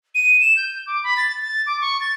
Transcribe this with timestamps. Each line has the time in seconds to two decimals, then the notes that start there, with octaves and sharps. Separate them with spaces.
0.15 D#7
0.41 E7
0.57 G6
0.87 D6
1.04 B5
1.17 A6
1.42 A6
1.66 D6
1.81 C#6
2.00 A6